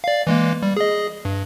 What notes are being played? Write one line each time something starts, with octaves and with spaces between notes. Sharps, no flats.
D5 F5
E3 G#3 A#3
G3
G#4 D#5
G2